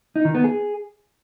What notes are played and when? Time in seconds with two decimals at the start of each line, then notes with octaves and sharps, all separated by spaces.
0.16 D#4
0.25 D#3
0.35 B3
0.44 G#4